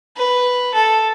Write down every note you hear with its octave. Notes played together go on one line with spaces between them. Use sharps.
B4
A4